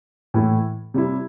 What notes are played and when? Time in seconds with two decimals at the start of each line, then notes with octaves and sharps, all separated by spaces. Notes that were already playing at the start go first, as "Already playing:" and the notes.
0.34 A2 E3 A3 E4
0.94 C3 G3 E4